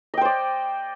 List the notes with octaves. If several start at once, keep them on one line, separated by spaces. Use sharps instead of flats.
C5 D5 D#5 G5